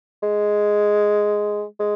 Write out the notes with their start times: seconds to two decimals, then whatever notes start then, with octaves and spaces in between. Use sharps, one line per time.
0.23 G#3
1.80 G#3